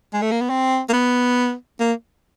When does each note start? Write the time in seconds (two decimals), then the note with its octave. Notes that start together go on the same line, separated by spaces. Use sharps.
0.13 G#3
0.22 A3
0.31 A#3
0.41 B3
0.50 C4
0.89 A#3
0.93 B3
1.80 A#3